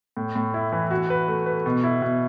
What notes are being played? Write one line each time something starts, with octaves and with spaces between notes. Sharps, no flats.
A2
A2
E4
E3
F#4
B4
A3
B4
B2
E4
B2